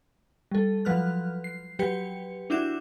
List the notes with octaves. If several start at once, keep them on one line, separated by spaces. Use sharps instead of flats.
G3 A4
F3 F#3 B4 F6 F#6
C7
F#3 G4 B4 G5 C#7
D4 E4 F#4 D6 G6 E7